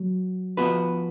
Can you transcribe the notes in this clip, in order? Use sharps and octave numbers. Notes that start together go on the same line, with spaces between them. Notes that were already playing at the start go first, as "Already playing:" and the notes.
Already playing: F#3
F3 B3 F#4 B4